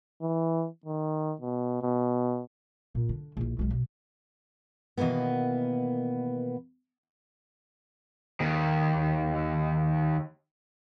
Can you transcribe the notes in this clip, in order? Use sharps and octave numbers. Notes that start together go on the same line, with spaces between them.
E3
D#3
B2
B2
A#2
D3
A#1 E4
B1 G#3
B2
B2 D#3 E3 A#3 B3
D#2 D#3